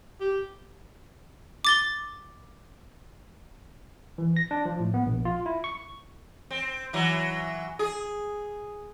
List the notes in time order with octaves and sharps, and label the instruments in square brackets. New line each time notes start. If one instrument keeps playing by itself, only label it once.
[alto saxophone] G4
[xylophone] D6 A6 G7
[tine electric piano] E3
A#6
D4
F3
A2
B3
A#1
F4
E4
C#6
[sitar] C4
E3 F#3
G#4